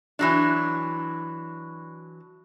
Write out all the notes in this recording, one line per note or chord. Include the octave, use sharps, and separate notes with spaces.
E3 F#3 D4